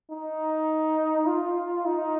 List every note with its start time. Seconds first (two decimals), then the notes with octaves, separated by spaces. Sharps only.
0.10 D#4
1.26 F4
1.86 D#4